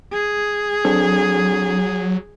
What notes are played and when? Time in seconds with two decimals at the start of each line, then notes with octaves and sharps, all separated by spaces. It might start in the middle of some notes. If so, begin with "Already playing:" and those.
0.13 G#4
0.85 F#3 C4 D4 A4